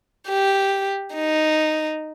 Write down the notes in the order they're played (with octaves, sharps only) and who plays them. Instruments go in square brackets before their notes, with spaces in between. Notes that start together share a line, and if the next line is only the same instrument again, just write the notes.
[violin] G4
D#4